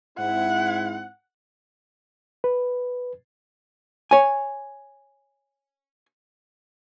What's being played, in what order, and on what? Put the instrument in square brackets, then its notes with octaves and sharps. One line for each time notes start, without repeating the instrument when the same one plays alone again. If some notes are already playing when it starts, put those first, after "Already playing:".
[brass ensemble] G#2 C4 E4 [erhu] F#5
[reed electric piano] B4
[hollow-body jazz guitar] C#5 G#5